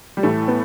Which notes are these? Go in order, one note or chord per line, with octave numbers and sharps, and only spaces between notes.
G3
A2 E3 A3
B3